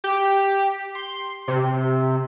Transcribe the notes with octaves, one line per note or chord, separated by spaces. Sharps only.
G4
C6
C3